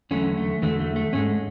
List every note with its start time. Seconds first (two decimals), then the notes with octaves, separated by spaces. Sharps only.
0.11 E2 D3 F#3 A3 C#4
0.37 A3
0.62 E2 D3 F#3 A3
0.79 A3
0.96 A3
1.13 G#2 G#3 A3 C#4